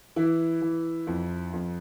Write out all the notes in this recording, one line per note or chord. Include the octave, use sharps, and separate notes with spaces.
E3 E4
E3
F2
F2